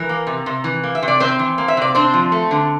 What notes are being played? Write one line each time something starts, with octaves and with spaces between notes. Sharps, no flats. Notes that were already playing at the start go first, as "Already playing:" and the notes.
Already playing: E3 A#4
A#3
C3
C3
E3
A#3
E5
C3
D5
C3 C4 C5
E3
A#3
E5
C3 D5
C4 D4 C5
F3
A3
D3